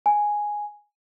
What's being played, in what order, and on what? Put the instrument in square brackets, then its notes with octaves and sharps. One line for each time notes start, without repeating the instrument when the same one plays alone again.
[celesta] G#5